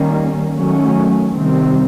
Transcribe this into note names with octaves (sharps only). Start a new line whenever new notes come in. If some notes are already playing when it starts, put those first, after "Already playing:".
Already playing: D#3 G3 A#3 C#4
D#3 F#3 A3 C#4
C3 D#3 G3 C4